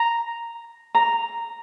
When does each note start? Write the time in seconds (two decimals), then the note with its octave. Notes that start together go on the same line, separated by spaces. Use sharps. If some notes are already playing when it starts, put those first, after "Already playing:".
Already playing: A#5
0.95 A#5